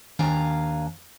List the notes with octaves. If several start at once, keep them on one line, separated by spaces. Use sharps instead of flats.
D#2 D4 F5 G#5 A#5